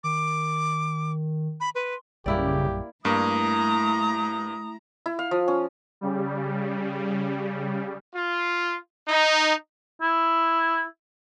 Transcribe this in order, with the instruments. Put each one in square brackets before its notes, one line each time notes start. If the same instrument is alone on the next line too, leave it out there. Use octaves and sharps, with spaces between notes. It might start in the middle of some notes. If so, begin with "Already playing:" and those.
[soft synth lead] D#3 [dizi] D6
[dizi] B5
[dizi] B4 [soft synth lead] C6
[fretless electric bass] A#1 F#2 G3 [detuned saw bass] C#3 [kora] A#3 E4 D5 [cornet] G4
[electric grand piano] G2 A#3 [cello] A3 E4 [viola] A#5 [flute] D#6
[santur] E4
F5
F3
C#4
[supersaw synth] C#3 G3
[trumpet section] F4
D#4
[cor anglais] E4